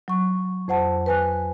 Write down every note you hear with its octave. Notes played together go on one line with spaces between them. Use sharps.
F#3 C#6
F2 C5 F#5 A5
B4 G#5 F#6